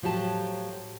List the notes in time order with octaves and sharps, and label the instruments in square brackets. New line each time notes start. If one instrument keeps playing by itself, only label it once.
[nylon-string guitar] A2 F3 F#3 G4 A5